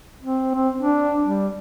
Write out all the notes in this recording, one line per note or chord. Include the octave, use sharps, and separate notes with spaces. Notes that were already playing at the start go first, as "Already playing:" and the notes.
C4
C4
D4
G3